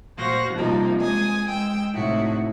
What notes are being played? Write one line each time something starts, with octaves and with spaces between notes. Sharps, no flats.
A#2 F#4 C5 F5 A#6
C3 F3 G3 A#3 D4 D#4
G#3 G#5 D#6
G#3 G5 E6
A2 C3 D#4 E4 F#4